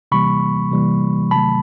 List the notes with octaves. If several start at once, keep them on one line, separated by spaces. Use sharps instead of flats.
C3 E3 G3 A#3 B5 C#6
C3 E3 G3 A#3
C3 D#3 F#3 A3 A5 B5